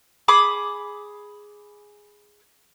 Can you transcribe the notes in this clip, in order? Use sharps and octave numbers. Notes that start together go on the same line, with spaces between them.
G#4 B5 D6 D#6